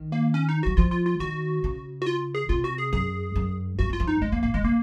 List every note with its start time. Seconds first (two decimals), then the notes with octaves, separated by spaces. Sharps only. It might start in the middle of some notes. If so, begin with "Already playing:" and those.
Already playing: D#3
0.12 A#3
0.34 C#4
0.49 D#4
0.63 F#3 F#4
0.77 F3 F4
0.91 F4
1.06 F4
1.20 D#3 F#4
1.64 C#3
2.02 F#4
2.06 F4
2.35 G#4
2.49 C3 F4
2.64 F#4
2.78 G#4
2.93 F#2 G#4
3.36 F#2
3.79 F#2 F#4
3.89 F#2 F4
4.00 F2
4.07 D#4
4.21 F#2 G#3
4.32 F2 A#3
4.43 A#2 A#3
4.54 D#3 G#3
4.63 C#3 A#3